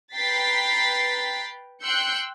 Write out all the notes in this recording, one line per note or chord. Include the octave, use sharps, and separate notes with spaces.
B4 G5 A#5 A6 B6 C7
G5 C6 E6 F#6 G6 C#7